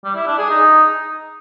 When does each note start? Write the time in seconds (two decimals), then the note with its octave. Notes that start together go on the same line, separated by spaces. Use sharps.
0.04 G3
0.16 E4
0.27 D4
0.38 G#4
0.49 D#4